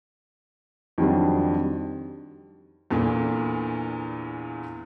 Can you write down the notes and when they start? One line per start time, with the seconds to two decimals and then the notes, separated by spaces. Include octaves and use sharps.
0.98 F2 D#3 F#3 G3 D4
2.91 E2 A#2 D3 E3